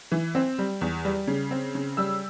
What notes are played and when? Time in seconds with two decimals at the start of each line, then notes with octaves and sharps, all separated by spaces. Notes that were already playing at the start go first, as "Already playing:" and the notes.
0.12 E3
0.35 C4
0.58 G3
0.81 E2
1.05 G3
1.27 C#3
1.51 C4
1.75 C#3
1.97 G3 E6